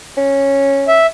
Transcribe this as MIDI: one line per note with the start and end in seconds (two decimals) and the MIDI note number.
0.17 1.03 61
0.88 1.06 76